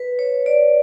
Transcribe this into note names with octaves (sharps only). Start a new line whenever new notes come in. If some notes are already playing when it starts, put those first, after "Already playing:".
Already playing: B4
C#5
D5